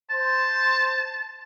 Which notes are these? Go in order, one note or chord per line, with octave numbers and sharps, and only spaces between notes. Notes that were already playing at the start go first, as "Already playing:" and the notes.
C5 A5